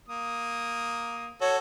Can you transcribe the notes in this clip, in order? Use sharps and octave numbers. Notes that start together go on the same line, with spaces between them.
A#3 D#6
F#4 A4 C#5